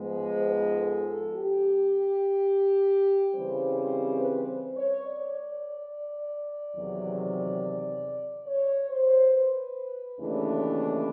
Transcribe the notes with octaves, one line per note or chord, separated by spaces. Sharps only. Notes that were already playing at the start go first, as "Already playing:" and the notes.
Already playing: G#2 F3 G#3 B3
C5
B4
A4
A4
G4
C#3 E3 G3 C4 C5
C5
B4
C5
C#5
D5
E2 C3 D#3 F#3
C#5
C5
B4
D#2 C#3 E3 A3 D4